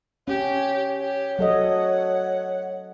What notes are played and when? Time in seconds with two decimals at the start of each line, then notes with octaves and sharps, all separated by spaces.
0.28 C#4 G4 C#5
1.00 G4 C#5
1.39 F#3 A4 D#5 F#5